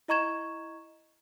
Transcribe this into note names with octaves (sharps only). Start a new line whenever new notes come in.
E4 D#5 A#5 C#6 G#6 E7